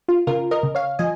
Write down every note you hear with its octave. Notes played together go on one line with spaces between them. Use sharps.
F4
C#3 F4 A#4
A#4 D#5
C#3
C#5 F5
F3 D#5 G#5